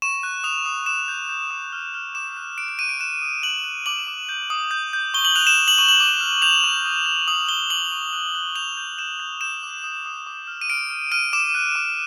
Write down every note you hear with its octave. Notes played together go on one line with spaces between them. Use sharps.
C#6 E7
F#6
D#6 F7
D#6
D6 E7
G6
G6
D#6
F6
F6
D6 E7
F#6
F#6 D7
D7
F#6 D#7
D7
F#6 E7
D#6
F#6 F#7
F#6
D6 F#7
D6
G6
D#6
G6
G6
C#6 G7
F#7
F#6 F7
E7
C#6
F#7
C#6 F#7
F#7
D6
F6
G6 F7
C#6
D#6
G6
D#6 F#7
G6 G7
C#6 F#7
C#6
F#6
F#6
G6 F7
G6
G6 E7
G6
G6 E7
D6
D#6
D#6
D6
F6
D#7
F6 D7
F6
F6 D#7
D6 E7
F#6
D6